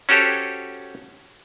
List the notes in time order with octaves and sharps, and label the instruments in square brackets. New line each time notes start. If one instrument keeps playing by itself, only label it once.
[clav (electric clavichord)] C#4 F#4 G4 A4 C5 C#5